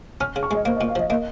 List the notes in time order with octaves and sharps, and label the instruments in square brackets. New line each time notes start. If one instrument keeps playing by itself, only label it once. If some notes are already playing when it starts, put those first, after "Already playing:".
[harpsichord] C#4 [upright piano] F6
[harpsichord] C#3
[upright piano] C#6
[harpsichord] G#3 [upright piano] D#5
[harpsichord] A#3 [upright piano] C5
[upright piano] D#5
[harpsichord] A#2
[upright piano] F5
[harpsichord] F3 [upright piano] D#5
[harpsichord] A#3 [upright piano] D#5